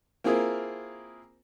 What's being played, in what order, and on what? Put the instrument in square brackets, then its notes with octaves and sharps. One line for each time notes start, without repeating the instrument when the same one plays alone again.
[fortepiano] A#3 C4 E4 F4 G#4 A#4